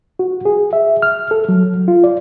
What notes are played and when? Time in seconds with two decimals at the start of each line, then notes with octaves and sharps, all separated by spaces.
0.19 F#4
0.45 G#4
0.73 E5
1.02 F6
1.31 A4
1.49 F#3
1.88 F4
2.04 D5